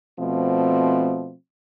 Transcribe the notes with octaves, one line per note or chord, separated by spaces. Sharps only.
B2 F3 A3 C4